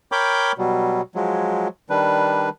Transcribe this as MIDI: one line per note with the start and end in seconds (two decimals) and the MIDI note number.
0.12 0.52 70
0.12 0.52 73
0.12 0.52 79
0.12 0.52 83
0.12 0.52 86
0.12 0.52 91
0.58 1.01 47
0.58 1.01 54
0.58 1.01 55
1.15 1.68 53
1.15 1.68 54
1.15 1.68 56
1.90 2.49 51
1.90 2.49 55
1.90 2.49 62
1.90 2.49 71